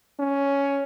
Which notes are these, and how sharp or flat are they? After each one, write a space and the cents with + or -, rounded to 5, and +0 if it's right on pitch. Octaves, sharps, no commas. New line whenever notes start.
C#4 +10